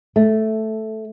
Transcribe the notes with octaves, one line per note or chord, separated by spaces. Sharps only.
A3